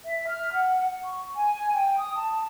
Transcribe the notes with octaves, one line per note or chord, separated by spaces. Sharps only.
E5
F6
F#5
C#6
G#5
G5
D#6
A5